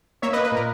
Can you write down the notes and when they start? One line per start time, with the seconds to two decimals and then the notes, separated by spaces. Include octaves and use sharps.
0.22 A#3 C#5 E5
0.33 B4 D#5
0.37 A#3
0.44 B4
0.52 A#2 A#4